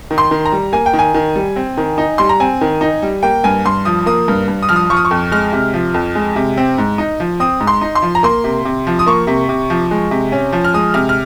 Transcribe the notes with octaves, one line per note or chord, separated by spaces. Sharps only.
D#3
C6
D#3
A#5
G3
A#3 G#5
G5
D#3
G#5
D#3
G3
C4
D#3
D#4
G3 C6
A#5
C4 G#5
D#3
D#4
G3
A#3 G5
G2 G#5
G2 C6
F3 D#6
A#3 D#6
G2
G2
D#6
F3 F6
D#6
F3 C#6
D#6
C#6
F2
G#3 F6
C3
F3
F2
G#3
C3
C4
G#2
D#4
F3
C4 D#6
G#2
C6
D#4
C6
F3
A#5
A#3 C6
C3
C3
F3
D#6
A#3 C#6
C3
C3
F3
G#3
C3
C#4
F3
F6
G#3 D#6
C3 F6
F6